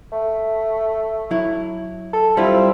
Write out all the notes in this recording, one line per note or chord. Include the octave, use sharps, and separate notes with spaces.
A3
F#3 E4
A4
G3 C4 E4 F4